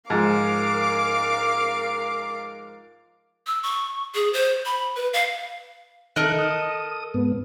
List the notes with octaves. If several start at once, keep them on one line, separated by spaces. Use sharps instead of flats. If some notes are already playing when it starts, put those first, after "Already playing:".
G#2 F3 A#4 F5 D6
E6
C#6
G#4
C5
B5
B4
F5
D#3 A4 A#4 D#5 F#6
D#6
G#2 B3